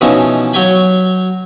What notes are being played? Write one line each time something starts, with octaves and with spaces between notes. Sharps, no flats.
B2 E3 F3 C#4 D#4
F#3 C#5 G5 G#5 B5